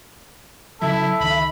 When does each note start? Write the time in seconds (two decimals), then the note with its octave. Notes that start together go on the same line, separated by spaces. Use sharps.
0.82 C#3 F#3 E4 A4 E5
1.20 C#2 D#3 B5